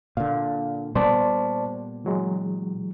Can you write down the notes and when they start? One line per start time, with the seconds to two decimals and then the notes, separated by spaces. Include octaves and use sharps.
0.17 A#2 D3 F5
0.95 A#2 G3 B3 C5 D5 A5
2.05 E3 F#3 G#3